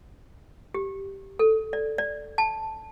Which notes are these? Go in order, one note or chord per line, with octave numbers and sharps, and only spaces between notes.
G4
A4
D5
D5
A5